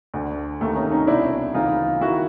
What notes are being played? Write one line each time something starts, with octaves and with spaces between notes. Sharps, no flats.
D2 D3
D#2 D#3 A3
C#4 D#4
C#4 D#4
C2 B2 D4 E4
D2 C#3 E3 D#4 F4
D#3 E4 F#4